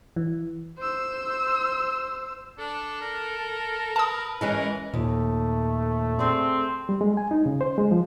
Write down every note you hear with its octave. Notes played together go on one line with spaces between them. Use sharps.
E3
C5 E6
D4 A4
A#4
B4 A5 D#6
E3 G#3 C#4 A#4
D#2 A#2 A3
C4 G#4 D5
G3
G#3
G#5
D#4
C#3
C5
G#3
F3